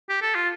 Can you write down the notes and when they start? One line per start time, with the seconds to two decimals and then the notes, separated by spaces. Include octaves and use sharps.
0.10 G4
0.22 A4
0.35 F4